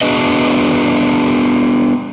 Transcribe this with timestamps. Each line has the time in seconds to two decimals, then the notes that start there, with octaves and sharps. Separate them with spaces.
0.01 B3 D4 F#4 G#4 B4 D#5